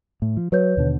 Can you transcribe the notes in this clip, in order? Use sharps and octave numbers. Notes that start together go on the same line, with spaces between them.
A2
F3
F#3 B4 C#5 G6
D#2 B2 D3